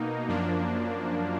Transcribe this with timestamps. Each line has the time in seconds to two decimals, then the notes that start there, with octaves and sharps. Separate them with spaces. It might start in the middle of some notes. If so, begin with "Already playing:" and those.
Already playing: B2 A#3 D#4
0.28 F#2 F3 A#3 D4